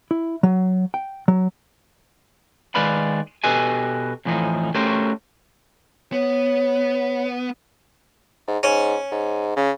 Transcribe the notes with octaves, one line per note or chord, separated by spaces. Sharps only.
E4
F#3
G5
F#3
D#3 G#3 B4 D5 F5 B5
B2 G4 A4 B4 D#5 G#5
F2 A2 E3 F3 D#4
A3 C#4 F#4 G4 A#4 C5
B3 C#5
G#2
G#2 C#4
G#2
C#3